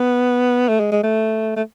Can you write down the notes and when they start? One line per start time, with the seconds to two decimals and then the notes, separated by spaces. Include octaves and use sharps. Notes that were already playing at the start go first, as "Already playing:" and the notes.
Already playing: B3
0.68 A3
0.80 G#3
0.92 G#3
1.03 A3
1.56 A3